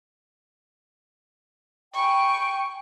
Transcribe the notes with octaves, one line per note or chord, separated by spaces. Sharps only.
G5 G#5 B5 C#6